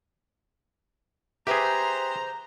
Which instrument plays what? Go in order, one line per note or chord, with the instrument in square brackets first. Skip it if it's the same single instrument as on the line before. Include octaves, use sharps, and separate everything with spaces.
[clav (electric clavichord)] G4 G#4 [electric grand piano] B4 E5 G5 [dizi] C5 [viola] A#5